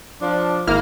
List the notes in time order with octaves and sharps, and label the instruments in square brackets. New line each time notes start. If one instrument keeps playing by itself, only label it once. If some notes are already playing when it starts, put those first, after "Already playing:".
[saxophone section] F3 D4
[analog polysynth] G#1 E4 F6 [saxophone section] A#3